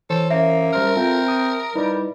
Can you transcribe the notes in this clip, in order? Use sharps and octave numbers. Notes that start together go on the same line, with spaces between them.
E3 A4 C5 C#5
F#2 A#3 E5
G3 A#4 C5 F6
C4 F4 A4
D#6
G3 D#4 E4 B4